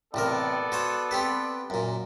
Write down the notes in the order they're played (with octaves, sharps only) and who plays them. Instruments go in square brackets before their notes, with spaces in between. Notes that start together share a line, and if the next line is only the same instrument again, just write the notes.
[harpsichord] A1 C3 A#4 [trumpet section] B3 A4 D5
[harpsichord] F#4 C5 C#5
C4 G4 B4
F#2 A#2